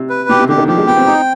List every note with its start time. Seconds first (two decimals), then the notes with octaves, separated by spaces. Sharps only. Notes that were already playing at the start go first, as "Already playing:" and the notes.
Already playing: C3
0.10 B4
0.29 B2 G4
0.39 C3
0.49 D3 G4
0.58 D#3
0.68 F3 G4
0.77 G#3
0.87 B3 G5
0.96 C4
1.06 D#4